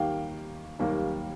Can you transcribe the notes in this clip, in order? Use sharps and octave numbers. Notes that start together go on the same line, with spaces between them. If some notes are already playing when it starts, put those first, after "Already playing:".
Already playing: D#2 D#3 G3 A#3 F5 G5
D#2 D#3 G3 A#3